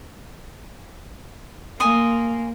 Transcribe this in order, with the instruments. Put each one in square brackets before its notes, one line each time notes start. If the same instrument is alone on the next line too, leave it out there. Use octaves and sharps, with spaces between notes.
[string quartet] A#3 [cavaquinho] G#5 C6 D#6